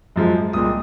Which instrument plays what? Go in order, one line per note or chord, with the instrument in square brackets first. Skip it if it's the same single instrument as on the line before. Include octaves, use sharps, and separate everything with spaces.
[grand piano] F#2 F3 G#3
C2 A#2 G#3 D#6